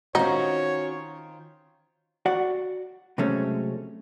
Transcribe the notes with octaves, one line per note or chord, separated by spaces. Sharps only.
D#3 C#4 D#4 F4 F#4 C5 C#5
F#4 D5 F#5
C3 F#3 G#3 A3 C#4